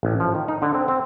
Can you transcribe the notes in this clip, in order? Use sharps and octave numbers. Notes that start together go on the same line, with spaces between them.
A1
F3
D#3
D#4
D3
C4
C4